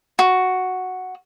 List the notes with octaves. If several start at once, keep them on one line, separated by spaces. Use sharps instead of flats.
F#4